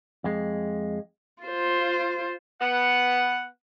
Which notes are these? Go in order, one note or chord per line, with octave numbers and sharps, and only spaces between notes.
F2 G#3
F4 C5
B3 F#5